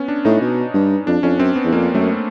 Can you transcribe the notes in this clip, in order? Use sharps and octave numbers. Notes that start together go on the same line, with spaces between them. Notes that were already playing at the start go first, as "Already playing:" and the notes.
Already playing: B3 C#4
D4
A2 D#4
B2
G2
F2 D4
F2 C#4
F#2 C4
B3
E2
F2 A#3
F#2 A3